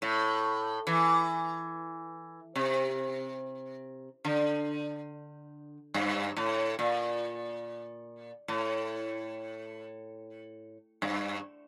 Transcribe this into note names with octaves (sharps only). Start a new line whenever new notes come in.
A2
E3
C3
D3
G2
A2
A#2
A2
G2